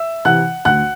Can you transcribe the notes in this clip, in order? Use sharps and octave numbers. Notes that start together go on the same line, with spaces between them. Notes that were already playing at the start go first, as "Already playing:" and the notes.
Already playing: E5 E6
C3 E3 F#5 F#6
D2 F#5 F#6